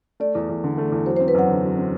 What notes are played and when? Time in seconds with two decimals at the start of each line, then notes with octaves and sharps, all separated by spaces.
0.20 A3 D5
0.35 E2
0.49 E2
0.64 D3
0.78 A3
0.92 E2
1.06 F#3 C5
1.17 C4 C5
1.28 B4
1.34 F#2 F#5
1.50 D3
1.64 F#3
1.78 C4